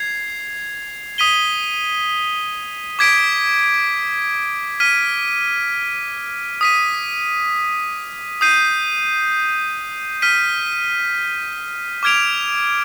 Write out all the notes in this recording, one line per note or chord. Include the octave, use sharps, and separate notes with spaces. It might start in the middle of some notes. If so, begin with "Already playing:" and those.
Already playing: G#6 C7 F7
D#6 B6 D#7 G7
D6 G#6 B6 D7
F6 B6 D#7
D#6 B6 D#7
D#6 G6 C7 D#7
F6 B6 D#7
D6 F6 G#6 D7 F7